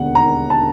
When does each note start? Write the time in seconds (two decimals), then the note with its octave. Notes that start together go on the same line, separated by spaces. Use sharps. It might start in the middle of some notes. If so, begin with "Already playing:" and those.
Already playing: E1 D#2 D3 F#5
0.15 A#5
0.50 A5